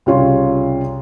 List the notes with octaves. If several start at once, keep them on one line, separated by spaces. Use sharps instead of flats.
C2 C#3 F4 C#5